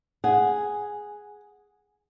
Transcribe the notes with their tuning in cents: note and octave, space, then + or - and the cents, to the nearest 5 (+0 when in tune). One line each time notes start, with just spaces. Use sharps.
G#4 +0 F#5 +0